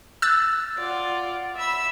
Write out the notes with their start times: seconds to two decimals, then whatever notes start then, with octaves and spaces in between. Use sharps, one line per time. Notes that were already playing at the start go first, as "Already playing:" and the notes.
0.22 E6 F#6 A6
0.77 F4 D5 F#5
1.55 E5 B5 E6